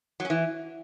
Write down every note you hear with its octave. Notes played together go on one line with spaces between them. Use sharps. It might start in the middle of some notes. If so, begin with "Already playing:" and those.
F#3
C#4
E3